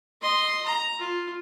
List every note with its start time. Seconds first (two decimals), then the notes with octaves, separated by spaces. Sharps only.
0.22 D#5 C6
0.66 A#5
0.99 F4